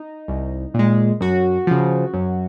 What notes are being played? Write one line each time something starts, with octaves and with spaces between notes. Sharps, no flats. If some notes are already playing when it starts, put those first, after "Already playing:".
Already playing: D#4
C2
A#2 G#3
F#2 F#4
C#3 F3
F#2